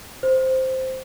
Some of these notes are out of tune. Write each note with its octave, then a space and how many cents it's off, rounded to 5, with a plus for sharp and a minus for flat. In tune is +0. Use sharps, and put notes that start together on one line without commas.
C5 +0